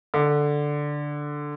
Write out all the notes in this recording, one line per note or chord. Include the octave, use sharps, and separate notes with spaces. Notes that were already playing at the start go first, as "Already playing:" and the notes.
D3